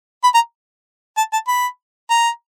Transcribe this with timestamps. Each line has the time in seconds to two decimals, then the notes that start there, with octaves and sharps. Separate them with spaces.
0.24 B5
0.34 A#5
1.17 A5
1.33 A5
1.48 B5
2.10 A#5